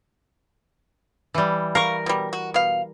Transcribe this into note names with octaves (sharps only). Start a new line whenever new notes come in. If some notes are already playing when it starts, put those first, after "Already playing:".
E3 G3
A#4 F5 C#6
B2 G3
F#4
B2 F5